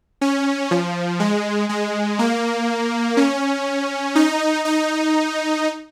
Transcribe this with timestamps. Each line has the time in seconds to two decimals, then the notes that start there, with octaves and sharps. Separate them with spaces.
0.21 C#4
0.71 F3
1.20 G#3
1.69 G#3
2.19 A#3
3.17 C#4
4.15 D#4
4.65 D#4